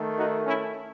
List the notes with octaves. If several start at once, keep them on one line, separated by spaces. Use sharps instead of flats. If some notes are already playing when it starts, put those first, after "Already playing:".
Already playing: D#3 A3
D#4 F#4
C#4 E4